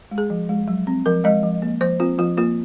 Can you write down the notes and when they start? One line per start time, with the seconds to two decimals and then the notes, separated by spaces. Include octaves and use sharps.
0.11 G#3
0.18 G#4
0.30 F3
0.49 G#3
0.68 F#3
0.87 C4
1.06 F3 A#4
1.24 G#3 D#5
1.43 F3
1.62 A#3
1.81 F3 C5
2.00 C4 F4
2.18 F3 F4
2.37 A#3 F4